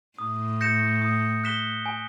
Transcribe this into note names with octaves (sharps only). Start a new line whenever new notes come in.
A2 D#6
G6 A#6 C#7 E7
D#6
F#6 B6 E7 G7
G#5